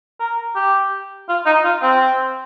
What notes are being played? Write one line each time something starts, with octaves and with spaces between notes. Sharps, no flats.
A#4
G4
F4
D#4
F4
C4